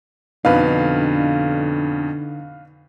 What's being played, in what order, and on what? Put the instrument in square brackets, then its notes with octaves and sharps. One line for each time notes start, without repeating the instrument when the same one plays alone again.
[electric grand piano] F2 B2 [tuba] D3 [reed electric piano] D4 D#4 [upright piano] B4 F5